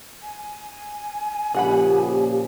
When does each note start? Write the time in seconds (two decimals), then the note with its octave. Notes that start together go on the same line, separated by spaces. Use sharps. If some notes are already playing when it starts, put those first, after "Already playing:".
0.22 G#5
1.54 A#2 C#3 F3 G4 G#4 F#5 B5